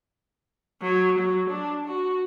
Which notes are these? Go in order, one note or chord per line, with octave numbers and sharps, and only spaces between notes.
F#3
F#3
D4
F#4